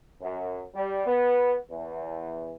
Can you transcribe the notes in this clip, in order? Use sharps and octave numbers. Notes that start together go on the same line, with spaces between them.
F#2
G3
B3
E2